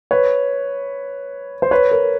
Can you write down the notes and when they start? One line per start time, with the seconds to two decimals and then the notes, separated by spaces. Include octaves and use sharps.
0.11 B4 C#5
1.62 C5
1.71 B4 C#5
1.91 A#4